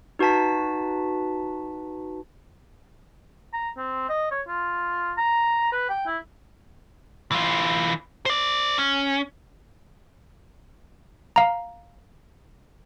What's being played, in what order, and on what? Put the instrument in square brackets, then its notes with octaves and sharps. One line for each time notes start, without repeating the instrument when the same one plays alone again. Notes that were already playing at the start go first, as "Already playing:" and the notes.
[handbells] D#4 F#4 B4 A5 B6
[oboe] A#5
C4
D#5
C#5
F4
A#5
B4
G5
E4
[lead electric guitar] E3 F4
C5 D5
C#4
[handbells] F5 A#5